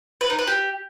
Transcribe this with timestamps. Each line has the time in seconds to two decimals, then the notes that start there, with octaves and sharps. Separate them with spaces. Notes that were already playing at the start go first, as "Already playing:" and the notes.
0.21 B4
0.30 D#4
0.39 B4
0.47 G4